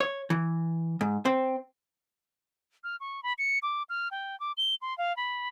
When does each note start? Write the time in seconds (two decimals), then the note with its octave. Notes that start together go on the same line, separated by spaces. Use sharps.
0.01 C#5
0.30 E3
1.01 G#2
1.25 C4
2.84 F6
3.00 C#6
3.23 B5
3.38 C#7
3.63 D6
3.89 F6
4.11 G5
4.40 D6
4.57 G7
4.82 C6
4.98 F5
5.17 B5